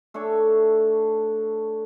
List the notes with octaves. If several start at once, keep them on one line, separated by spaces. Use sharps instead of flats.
A3 D4 A4 C#5